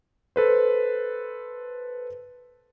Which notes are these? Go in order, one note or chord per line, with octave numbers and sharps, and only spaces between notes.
A4 B4 C5